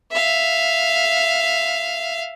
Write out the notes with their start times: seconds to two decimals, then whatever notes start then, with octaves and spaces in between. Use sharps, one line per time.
0.12 E5 F5